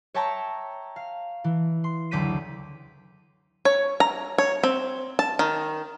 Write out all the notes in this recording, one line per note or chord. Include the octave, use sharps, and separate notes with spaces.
C#5 E5 G5 A5 A#5 C#6
F5
E3
C6
F#1 D2 D6 G6 B6 D#7
C#5
A#5
C#5
C4
A5
D#3